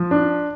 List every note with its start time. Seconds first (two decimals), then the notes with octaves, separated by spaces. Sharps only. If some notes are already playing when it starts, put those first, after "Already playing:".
Already playing: F3
0.11 D4